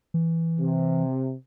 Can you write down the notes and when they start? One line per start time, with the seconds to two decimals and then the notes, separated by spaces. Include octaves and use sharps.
0.14 E3
0.59 C3